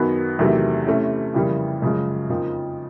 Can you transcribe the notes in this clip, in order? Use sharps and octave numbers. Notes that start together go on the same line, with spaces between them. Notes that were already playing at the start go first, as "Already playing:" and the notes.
Already playing: F#2 D#3 F#3 B3
E2 C3 D#3 F#3 A3
C3 E3 A3 C#4 E4
F2 C#3 E3 G3 A#3
F#2 C#3 F3 G#3
F2 C#3 F3 A#3 D#4